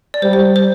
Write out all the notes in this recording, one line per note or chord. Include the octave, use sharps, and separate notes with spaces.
D5
G3 C5
C5
C5